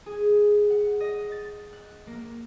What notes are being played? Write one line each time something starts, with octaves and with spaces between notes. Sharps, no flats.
G#4
F#5
D#5
A6
F#6
A#3